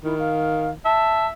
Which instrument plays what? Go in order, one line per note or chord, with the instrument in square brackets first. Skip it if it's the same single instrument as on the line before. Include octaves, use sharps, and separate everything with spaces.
[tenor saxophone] D#3 [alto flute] E4
[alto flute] F5
[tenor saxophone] E5 [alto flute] A5